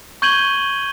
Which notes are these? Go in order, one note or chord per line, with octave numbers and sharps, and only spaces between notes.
C#6 G6 G#6 D#7 F#7 G7